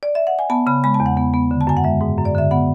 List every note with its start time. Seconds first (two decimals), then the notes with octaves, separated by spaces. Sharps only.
0.03 D5
0.15 E5
0.27 F#5
0.39 G#5
0.50 B3 A5
0.67 C#3 B5
0.84 G#3 B5
0.94 A5
1.00 E2
1.06 F#5
1.17 B3
1.34 B3
1.51 D3
1.61 A5
1.67 F#2 G#5
1.77 F#5
1.84 G#3 E5
2.01 G#2
2.18 F#2
2.25 D5
2.35 D3 E5
2.51 B3 F#5